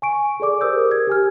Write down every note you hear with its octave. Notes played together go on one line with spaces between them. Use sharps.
G#5 C#6 D7
G#4 A4 D5 D6
G4 A#4 C5 D#6 E6 G6
G#6
G4 G#5 F6